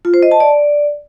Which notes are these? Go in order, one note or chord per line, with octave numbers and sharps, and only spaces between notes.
F4
C5
D#5
A5
D5